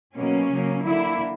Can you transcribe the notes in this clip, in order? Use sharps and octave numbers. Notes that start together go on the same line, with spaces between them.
B2 F#3 A#3 C#4
C#3 F#3 A#3
D3 A#3 E4